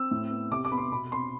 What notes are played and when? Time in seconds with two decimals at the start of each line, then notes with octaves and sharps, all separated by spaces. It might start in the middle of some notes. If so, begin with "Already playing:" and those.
Already playing: C4 E6
0.11 A2
0.31 B3
0.51 C3 D6
0.65 D6
0.72 B3 B5
0.78 C6
0.92 B2 B5
1.12 C4 C6